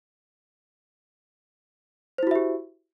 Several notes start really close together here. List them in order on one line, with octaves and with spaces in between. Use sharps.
C5 E4 F#4 E5 G4